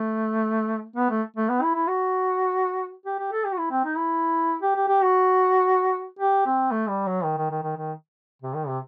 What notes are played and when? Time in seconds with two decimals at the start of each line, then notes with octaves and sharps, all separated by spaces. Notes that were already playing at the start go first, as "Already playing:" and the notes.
Already playing: A3
0.96 B3
1.10 A3
1.36 A3
1.49 B3
1.62 E4
1.75 E4
1.88 F#4
3.06 G4
3.19 G4
3.32 A4
3.45 G4
3.52 F#4
3.58 E4
3.71 C4
3.85 D#4
3.97 E4
4.62 G4
4.76 G4
4.88 G4
5.02 F#4
6.19 G4
6.46 C4
6.71 A3
6.89 G3
7.07 F#3
7.24 D#3
7.38 D#3
7.51 D#3
7.63 D#3
7.77 D#3
8.42 C3
8.55 D#3
8.67 C3